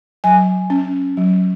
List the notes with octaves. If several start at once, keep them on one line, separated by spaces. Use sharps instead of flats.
F#3 G#5
C#4
F#3